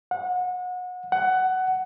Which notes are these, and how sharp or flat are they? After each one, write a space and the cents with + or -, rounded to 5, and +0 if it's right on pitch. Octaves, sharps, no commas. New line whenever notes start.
F#5 -30
F#5 +15